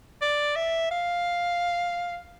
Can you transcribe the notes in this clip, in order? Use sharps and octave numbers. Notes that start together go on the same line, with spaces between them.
D5
E5
F5